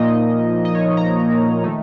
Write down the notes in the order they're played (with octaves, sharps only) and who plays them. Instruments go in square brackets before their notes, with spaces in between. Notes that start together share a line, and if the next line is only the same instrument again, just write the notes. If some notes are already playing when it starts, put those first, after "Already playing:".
Already playing: [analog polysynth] A#2 F3 A#3 D#4 D#5
D#5
C#5
A#5
D#3 A3 D#4